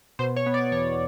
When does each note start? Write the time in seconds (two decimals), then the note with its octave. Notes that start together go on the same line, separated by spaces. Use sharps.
0.19 B2 C5
0.36 C#5
0.46 B3
0.54 D5
0.72 E2 C#5